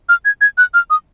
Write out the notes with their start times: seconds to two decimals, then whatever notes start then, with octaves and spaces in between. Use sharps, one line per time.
0.09 F6
0.25 G#6
0.41 G#6
0.58 F#6
0.74 F6
0.90 D#6